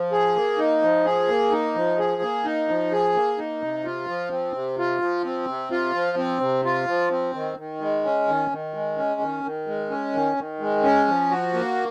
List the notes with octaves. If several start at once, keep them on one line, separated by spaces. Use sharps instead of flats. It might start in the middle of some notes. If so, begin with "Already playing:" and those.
Already playing: F3
G#4
A#3
D#4
F3
G#4
A#3
D#4
F3
G#4
A#3
D#4
F3
G#4
A#3
D#4
C3
F4
F3
C4
C3
F4
F3
C4
C3
F4
F3
C4
C3
F4
F3
C4
D#3
D#3
G#3
C#4
D#3
D#3
G#3
C#4
D#3
D#3
G#3
C#4
D#3
D#3
G#3
C#4
F3
F#4
A#3